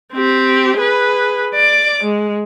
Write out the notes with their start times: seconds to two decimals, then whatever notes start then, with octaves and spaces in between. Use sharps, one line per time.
0.13 C4 G4
0.78 G#4 B4
1.55 D5 D6
2.04 G#3